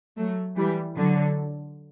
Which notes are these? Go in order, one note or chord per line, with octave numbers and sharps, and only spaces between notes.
F#3 A3
E3 G3
D3 F#3